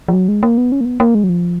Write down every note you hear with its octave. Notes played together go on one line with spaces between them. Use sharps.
F3
F#3
G#3
A#3
B3
C#4
A#3
B3
A#3
G#3
F#3
F3